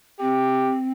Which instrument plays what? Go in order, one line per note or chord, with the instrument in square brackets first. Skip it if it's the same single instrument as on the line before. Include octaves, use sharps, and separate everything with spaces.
[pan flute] C4 [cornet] G4